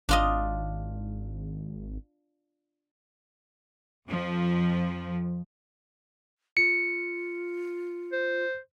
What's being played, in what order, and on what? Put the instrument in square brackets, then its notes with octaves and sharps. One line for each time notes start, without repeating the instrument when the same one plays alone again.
[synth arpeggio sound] G#1 [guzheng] D4 F4 D#5
[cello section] F2 F3
[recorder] F4 [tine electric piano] C#7
[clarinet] C5